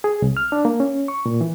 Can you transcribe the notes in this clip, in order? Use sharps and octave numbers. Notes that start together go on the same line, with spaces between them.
G#4
C2
F6
D4
A#3
C#4
C#6
A#2
E3